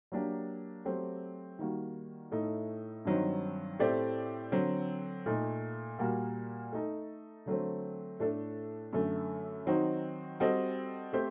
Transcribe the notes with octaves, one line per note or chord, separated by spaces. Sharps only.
F#3 A#3 D4 G4
F#3 A3 C4 G4
D#3 G3 A#3 F#4
A2 A3 D#4
G2 D#3 F#3 C4 D#4
A2 A3 C4 G4 D5
D3 F#3 C4
A#2 A3 D#4
A#2 G3 A#3 F#4 A#4
A3 D#4 A4
D3 F#3 A3 C4
A2 A3 D4 A4
F#2 D3 A3
D#3 F#3 C4 D#4 F#4
G3 C4 F#4 A4 D#5
A3 C4 G4 C5